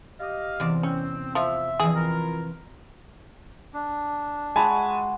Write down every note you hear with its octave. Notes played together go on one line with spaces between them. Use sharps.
G4 D#5 F5
E2 C3 D5
C4 C#4
F3 E5
F2 E3 G#4
E4 F4 A#4
D4
G#3 F#4 G#5 A5 B5